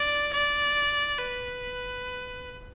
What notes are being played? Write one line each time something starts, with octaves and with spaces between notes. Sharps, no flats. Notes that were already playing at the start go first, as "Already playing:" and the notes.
Already playing: D5
D5
B4